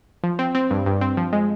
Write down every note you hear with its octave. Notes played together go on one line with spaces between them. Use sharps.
F3
C4
C4
G2
G2
C4
F3
G#3